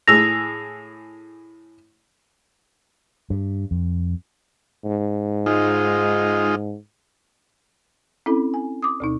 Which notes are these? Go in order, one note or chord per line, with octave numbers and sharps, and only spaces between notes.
A2 G#4 E6 A#6 F7
G2
F2
G#2
G#3 D#4 F4
C4 C#4 E4 A4
G#5
D6 D#6
D2 B2 D#4